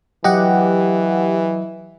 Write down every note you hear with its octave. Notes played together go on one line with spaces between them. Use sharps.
E3 F#3 G4 D#5 F#5